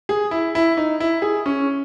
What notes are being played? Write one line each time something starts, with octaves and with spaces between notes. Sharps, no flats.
G#4
E4
E4
D#4
E4
G#4
C#4